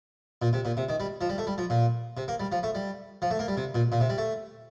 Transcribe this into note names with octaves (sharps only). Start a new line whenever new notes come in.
A#2
C3
A#2
C3
D#3
G3
F3
G3
A3
G3
F3
A#2
C3
A#3
G3
F3
A3
G3
F3
A3
A#3
G3
C3
A#2
A#2
C3
G3
A3